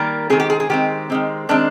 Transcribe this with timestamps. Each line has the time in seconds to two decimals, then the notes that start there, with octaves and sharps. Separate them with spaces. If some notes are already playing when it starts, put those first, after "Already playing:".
Already playing: D#3 G3 A#3 A#4
0.30 D#3 G#3 C4 G#4
0.40 G4
0.50 G#4
0.60 G#4
0.70 D#3 G#3 C4 G4
1.10 D#3 G#3 C4
1.49 D#3 G#3 C4 D4